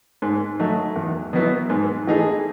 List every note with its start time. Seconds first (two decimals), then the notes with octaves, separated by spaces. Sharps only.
0.22 G#2
0.59 F#3 A3 D#4
0.96 E2
1.33 B2 F#3 B3 E4
1.70 G#2
2.07 E3 A3 D#4 G#4